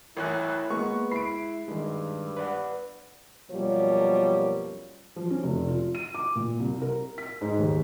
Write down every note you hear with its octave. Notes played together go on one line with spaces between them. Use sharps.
A1 A2 E4 A#4 C#5 G#5 F#6
G#3 A#3 B3 C#6
E4 B5 C7 D7
G2 D#3 G#3
B4 D5 F#5
F#2 B2 F3 G3 A#3 C#5
F3
C#4
F1
F4
D#7
D6
A#2
C2
A#4
B6
G#2
D#2